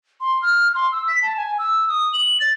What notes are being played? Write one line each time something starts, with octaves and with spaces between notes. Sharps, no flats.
C6
F6
C6
E6
B6
A5
G#5
E6
D#6
F#7
A6